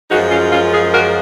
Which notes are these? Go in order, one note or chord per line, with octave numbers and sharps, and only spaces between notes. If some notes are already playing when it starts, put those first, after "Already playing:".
F#2 F3 G#3 D#4 F#4
C#4 F4
C#4 F4
F4 G#4
F#4 A#4